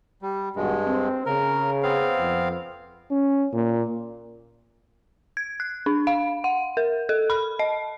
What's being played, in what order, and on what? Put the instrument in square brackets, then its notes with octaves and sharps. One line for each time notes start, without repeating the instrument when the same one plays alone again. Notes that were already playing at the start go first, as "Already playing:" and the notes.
[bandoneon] G3
[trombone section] G#1 B2 F#4 [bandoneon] G2 G#3
[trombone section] C4
[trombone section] C#3 [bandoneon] A#4
[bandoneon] B3 C4 F5
[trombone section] F2
[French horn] C#4
A#2
[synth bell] G#6
F#6
D4
F5
F#5
A#4
A4
B5
D#5